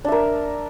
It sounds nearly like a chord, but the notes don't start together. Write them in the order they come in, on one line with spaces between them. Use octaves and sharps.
D4 E5 A#4